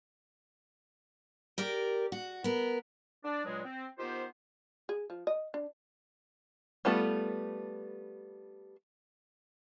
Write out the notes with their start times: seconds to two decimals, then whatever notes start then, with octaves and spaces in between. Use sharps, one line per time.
1.58 G4 A#4 D5
2.12 F#4
2.44 B3 A#4
3.24 D4 D5
3.44 G2 A#2 F#3 G#3
3.64 C4
3.98 D#3 B3 F4 G4 C5
4.89 G#4
5.10 F3
5.27 D#5
5.54 D4
6.85 G3 A3 B3 F4 A4